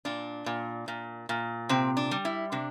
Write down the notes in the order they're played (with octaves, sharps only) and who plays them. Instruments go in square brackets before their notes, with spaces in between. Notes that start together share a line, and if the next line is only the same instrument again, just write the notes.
[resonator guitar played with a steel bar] A#2 D4
A#2
A#2
A#2
C3 C4
D4
G3
E4
C3 D4